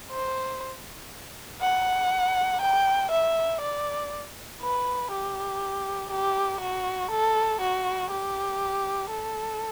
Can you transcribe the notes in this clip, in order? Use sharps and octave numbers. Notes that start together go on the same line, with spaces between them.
C5
F#5
G5
E5
D5
B4
G4
G4
F#4
A4
F#4
G4
A4